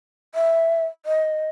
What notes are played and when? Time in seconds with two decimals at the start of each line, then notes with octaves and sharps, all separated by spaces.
0.35 E5
1.06 D#5